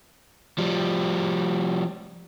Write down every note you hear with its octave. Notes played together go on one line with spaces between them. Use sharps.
F3 G3